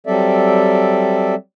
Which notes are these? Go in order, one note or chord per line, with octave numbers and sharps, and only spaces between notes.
F#3 G3 C4 A4 D5 E5